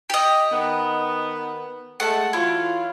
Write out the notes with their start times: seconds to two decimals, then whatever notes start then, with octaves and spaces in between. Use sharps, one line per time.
0.10 G4 D#5
0.51 D#3 B3
2.00 G#3 A3 F#5 A5
2.33 E3 F#3 E4 F4